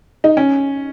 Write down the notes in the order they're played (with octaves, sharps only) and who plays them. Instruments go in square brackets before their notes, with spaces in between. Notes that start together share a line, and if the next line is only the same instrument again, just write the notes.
[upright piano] D#4
C#4